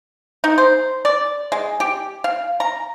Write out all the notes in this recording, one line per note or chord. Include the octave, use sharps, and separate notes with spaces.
D#4
C5
D5
G#3
G4
F5
A#5